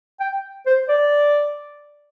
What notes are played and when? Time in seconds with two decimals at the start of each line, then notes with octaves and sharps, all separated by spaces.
0.20 G5
0.66 C5
0.89 D5